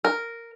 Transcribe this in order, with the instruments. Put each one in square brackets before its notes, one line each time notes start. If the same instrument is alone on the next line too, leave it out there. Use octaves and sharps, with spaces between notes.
[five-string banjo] A#4